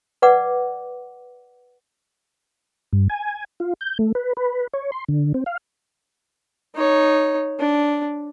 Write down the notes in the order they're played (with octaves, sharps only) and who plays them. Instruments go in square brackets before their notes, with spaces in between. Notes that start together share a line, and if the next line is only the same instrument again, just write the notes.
[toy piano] B4 D5 F#5 D6
[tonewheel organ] G2
G#5
F4
G6
A3
B4
B4
C#5
C6
D3
C4
F5
[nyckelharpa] D#4 C#5
D4